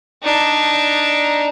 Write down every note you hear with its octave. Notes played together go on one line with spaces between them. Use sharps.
D4 D#4